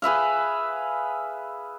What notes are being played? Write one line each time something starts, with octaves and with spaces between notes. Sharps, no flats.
G#4 B4 E5 F5